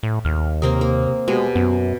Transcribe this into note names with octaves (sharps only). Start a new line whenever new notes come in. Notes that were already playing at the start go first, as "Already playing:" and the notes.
A2
D#2 F6
C3 A#3 C4 G4 A#4 D#6
A#3
B2 G#3 F#4 G4
F#2 B3 F#4